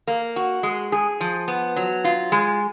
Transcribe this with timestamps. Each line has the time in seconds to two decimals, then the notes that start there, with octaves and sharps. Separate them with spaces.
0.07 A#3
0.36 F#4
0.63 G#3
0.92 G#4
1.21 F3
1.48 B3
1.76 F#3
2.04 F4
2.32 G#3